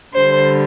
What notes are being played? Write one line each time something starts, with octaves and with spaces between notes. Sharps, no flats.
D3 G3 C5